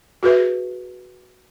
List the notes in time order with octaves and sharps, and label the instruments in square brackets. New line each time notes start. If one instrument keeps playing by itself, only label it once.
[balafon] F#4 G#4 B4 E5